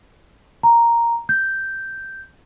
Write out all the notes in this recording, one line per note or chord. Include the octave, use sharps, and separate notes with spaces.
A#5
G6